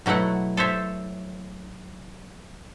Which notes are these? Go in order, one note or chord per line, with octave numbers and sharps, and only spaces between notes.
B2 F#3 A3 E4 F#5
A4 C5 C#5 E5